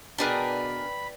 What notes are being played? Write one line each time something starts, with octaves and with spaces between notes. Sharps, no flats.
B2 D4 G#4 A#4 B4 D5 G5 B5